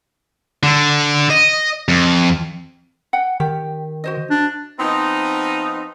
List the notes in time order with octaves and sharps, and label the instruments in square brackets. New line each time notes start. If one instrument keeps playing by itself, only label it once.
[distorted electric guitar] D3
D#5
F2
[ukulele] F#5 G5
[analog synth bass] D#3 [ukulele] G4
[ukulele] F#4 C5 D#5
[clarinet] D4
[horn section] F3 B3 C4 D#4